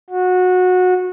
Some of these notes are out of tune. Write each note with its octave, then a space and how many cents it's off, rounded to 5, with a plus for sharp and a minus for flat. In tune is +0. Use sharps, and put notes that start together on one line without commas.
F#4 -20